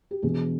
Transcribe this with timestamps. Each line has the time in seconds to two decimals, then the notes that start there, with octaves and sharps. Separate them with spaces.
0.11 G4
0.22 E1 E2 B2 G#4